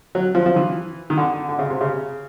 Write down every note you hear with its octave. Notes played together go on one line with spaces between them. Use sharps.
F#3
F3
F3
E3
D#3
D3
D3
C#3
C3
C#3